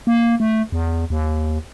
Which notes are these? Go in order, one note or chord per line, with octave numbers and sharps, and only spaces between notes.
A#3
A3
E2
D#2